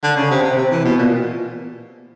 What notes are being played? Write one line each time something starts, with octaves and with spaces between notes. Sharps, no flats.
D3
C#3
C3
C3
C3
E3
B2
A#2